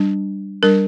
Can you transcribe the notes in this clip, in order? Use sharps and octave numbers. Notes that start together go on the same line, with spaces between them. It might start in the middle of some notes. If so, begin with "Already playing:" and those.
Already playing: G3 D4
G3 D4 A#4